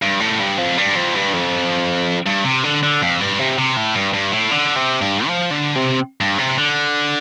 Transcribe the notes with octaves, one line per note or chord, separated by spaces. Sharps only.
G2
A2
G2
F2
G2
F2
G2
F2
G2
C3
D3
D3
F2
G2
C3
C3
A2
G2
G2
A2
D3
C3
G2
F3
D3
C3
G2
C3
D3